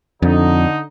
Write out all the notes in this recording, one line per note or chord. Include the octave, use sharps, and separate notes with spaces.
F2 D3 D#4